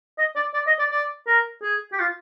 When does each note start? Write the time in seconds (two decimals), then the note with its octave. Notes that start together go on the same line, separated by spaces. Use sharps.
0.18 D#5
0.36 D5
0.54 D5
0.67 D#5
0.79 D5
0.91 D5
1.27 A#4
1.63 G#4
1.92 G4
2.00 F4